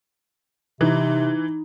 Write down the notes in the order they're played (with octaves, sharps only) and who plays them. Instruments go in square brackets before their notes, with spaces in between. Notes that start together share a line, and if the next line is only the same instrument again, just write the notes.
[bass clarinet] C3 [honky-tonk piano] E3 [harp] D#4